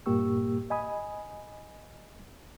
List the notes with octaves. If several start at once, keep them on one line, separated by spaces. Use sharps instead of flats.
G2 A#2 A#3 G4 C#6 E6
D#5 G#5 B5 D#6